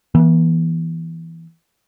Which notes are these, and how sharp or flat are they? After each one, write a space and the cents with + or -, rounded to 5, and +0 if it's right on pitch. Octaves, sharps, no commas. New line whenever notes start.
E3 +0 B3 -45